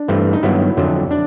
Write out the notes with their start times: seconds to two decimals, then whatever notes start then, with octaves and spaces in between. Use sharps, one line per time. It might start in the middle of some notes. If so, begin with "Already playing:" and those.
Already playing: D4
0.08 G2 E3 A3 C4
0.33 D#4
0.43 G2 D#3 F#3 B3 E4
0.77 F2 D3 F#3
1.11 D4